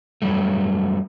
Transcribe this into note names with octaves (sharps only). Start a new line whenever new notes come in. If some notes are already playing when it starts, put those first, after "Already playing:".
F#2 A#2 F#3 G3 A3